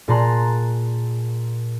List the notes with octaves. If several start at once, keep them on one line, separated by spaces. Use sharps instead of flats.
A#2 G#4 A5 A#5 C6 F#6